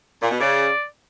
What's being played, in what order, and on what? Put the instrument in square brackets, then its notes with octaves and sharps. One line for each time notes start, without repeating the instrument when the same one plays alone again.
[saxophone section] A#2
B2
[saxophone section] C#3 [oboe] D5